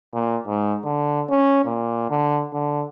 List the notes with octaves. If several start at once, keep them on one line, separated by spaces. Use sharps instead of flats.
A#2
G#2
D3
C#4
A#2
D3
D3